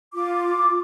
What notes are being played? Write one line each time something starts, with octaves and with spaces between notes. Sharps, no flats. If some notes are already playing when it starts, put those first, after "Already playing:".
F4 D6